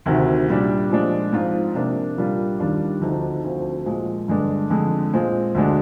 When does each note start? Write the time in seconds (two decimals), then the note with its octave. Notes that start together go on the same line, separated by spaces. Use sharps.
0.06 D2 C3 D#3
0.48 A#2 G3 D4
0.90 A#2 F3 G#3 D4
1.33 G#2 F3 C4 F4
1.74 C3 F3 A#3 D4
2.17 A#2 G3 A#3 D4 F4
2.59 D#2 D#3 G3 D4 F4
3.01 D2 D3 F3 C4 D#4
3.44 D2 D3 F3 C4
3.86 A#2 F3 G#3
4.28 G2 D3 G#3 D4
4.70 F2 D3 G#3
5.13 A#2 G#3 C4 F4
5.54 D2 D3 G#3 D4